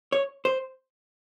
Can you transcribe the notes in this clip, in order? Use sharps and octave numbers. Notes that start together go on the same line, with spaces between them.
C#5
C5